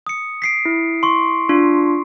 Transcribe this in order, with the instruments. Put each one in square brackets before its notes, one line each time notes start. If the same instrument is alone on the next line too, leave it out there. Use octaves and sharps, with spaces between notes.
[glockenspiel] D#6 C#7
B6 C7 D7
[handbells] E4
[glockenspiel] C6 C#6
[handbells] D4 F4